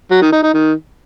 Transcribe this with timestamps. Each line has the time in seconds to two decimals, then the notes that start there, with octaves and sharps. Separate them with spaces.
0.11 F#3
0.22 D#3
0.32 D#4
0.43 D#4
0.54 D#3